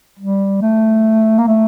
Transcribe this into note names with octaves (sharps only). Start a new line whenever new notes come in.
G3
A3
A#3
A3